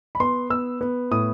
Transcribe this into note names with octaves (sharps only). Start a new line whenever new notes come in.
B5
B3 C6
B3 E6
B3
A2 D#6